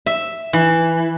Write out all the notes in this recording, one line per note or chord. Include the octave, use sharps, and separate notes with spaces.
E5
E3